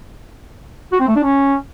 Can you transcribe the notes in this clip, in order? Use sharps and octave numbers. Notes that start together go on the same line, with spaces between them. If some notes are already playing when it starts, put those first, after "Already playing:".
F#4
C4
A3
D4
C#4